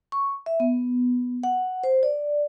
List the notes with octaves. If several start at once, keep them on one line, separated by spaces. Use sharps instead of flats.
C#6
E5
B3
F#5
C5
D5